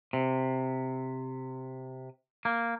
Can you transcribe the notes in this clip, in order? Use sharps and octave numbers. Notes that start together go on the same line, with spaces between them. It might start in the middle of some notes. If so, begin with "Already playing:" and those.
C3
A#3